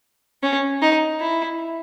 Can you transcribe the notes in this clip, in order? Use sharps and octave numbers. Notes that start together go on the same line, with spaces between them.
C#4
D#4
E4